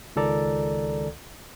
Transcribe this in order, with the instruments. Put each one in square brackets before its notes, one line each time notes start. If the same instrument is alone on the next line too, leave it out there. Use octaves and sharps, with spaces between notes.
[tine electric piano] C#2 D#3 A4 D5 A#5